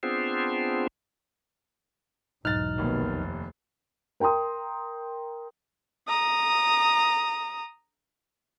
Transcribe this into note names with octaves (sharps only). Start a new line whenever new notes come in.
B3 C4 D4 F4 G#4 C5
B1 E2 G#2 D#4 F6 F#6 A6
F1 D#2 B2 A#3 B3
F2
A#4 G5 A#5 C6 D#6
A#5 D#6